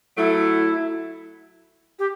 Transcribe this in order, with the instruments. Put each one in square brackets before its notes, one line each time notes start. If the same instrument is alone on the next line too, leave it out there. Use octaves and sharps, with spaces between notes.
[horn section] F#3 A3 [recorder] E4
[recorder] G4